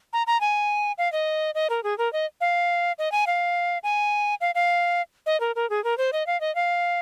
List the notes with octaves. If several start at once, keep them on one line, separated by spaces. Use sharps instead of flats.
A#5
A#5
G#5
F5
D#5
D#5
A#4
G#4
A#4
D#5
F5
D#5
G#5
F5
G#5
F5
F5
D#5
A#4
A#4
G#4
A#4
C5
D#5
F5
D#5
F5